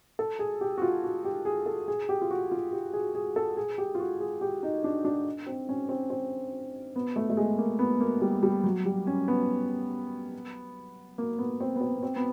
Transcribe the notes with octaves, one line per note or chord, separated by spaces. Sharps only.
A4
G#4
G4
F#4
F4
F#4
G4
G#4
A4
G#4
G4
F4
F#4
F4
G4
G#4
G#4
A4
G#4
G4
F4
F#4
G#4
G4
D#4
D4
D4
C4
C#4
C4
C4
B3
A3
A3
G#3
A#3
B3
A#3
G3
G3
F#3
G3
C#4
B3
A#3
B3
C4
B3
C4
B3
C4
B3